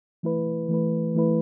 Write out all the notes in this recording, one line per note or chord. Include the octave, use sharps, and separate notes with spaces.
E3 A3 E4 B4
E3 A3 E4 B4
E3 A3 E4 B4